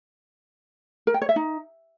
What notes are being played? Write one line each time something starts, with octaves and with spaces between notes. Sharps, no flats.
A#4
G5
C#5
E5
D#4